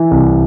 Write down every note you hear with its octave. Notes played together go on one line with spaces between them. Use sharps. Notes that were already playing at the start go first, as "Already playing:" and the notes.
Already playing: E3
C2